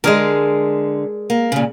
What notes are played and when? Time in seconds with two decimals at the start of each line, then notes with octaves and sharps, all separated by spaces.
0.04 D3 G#3 G#4 A#4
1.30 A#3
1.52 A#2 C#3